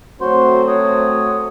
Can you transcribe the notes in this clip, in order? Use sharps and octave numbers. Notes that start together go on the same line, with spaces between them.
F#3 A3 C4 F#4 C5 C6
C#5 D#6